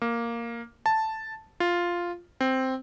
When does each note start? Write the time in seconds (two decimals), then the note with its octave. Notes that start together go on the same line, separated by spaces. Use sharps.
0.02 A#3
0.86 A5
1.60 F4
2.41 C4